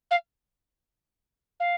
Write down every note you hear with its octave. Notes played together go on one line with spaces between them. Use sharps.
F5
F5